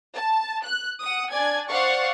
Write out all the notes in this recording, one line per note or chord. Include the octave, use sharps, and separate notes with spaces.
A5
F#6
F#5 D#6
D4 D5 G#5 G#6
C5 D5 F5 F#5 C#6